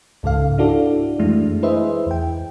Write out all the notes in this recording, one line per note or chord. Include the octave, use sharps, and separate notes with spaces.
C#2 G#2 C#3 A4 F5
D4 E4 F#4 A4 D5
F#2 E3 G#3 A3 D4 E4
E4 G#4 B4 C5 D#5 E5
E2 G5